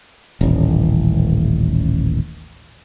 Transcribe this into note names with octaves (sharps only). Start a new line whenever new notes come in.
D#1 A1